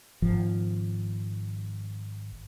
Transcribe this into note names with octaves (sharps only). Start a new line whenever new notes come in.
G#1 F3